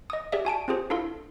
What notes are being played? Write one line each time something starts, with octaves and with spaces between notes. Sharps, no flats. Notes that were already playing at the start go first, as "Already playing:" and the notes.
D#5 D#6
G4 G#4 D5 E5
F#4 G#5 A5 D7
C4 F4 G4 G#4 C5
D4 E4 F4 A4 F5 C6